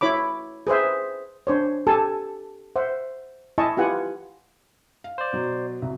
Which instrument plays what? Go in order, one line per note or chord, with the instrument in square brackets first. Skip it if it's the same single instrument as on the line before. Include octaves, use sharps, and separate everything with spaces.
[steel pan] E4 C#5 B5 D6
G#4 B4 C5 E5
D4 C5 C#5
G4 A4 G#5 A5
C5 E5 F#5
E4 D#5 E5 G#5 A5 C#6
E4 F4 G4 B4 F#5 G#5
[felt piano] F5
[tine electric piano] C5 D5
[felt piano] B2 F#3
C2 F#3